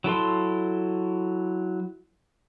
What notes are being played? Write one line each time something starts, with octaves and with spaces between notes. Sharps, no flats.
F#3 E4 A4 C6